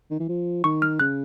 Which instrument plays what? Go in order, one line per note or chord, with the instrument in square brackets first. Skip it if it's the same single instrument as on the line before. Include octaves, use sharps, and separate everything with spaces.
[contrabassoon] D#3
E3
F3
[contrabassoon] D#3 [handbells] C#6
[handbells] F6
[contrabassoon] C#3 [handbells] F#6